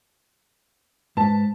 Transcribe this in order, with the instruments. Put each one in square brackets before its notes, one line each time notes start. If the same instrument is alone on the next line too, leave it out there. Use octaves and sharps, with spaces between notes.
[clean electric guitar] G#2 B4 [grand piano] A5